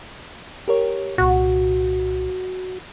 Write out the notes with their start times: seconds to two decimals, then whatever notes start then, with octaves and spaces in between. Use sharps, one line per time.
0.68 G4 A#4 C#5
1.18 C2 A#2 F#4